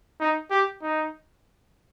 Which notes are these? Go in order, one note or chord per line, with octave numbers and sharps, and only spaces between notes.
D#4
G4
D#4